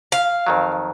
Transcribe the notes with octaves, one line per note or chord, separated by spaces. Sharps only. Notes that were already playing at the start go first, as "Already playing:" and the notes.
F5
F2 D#3 F#3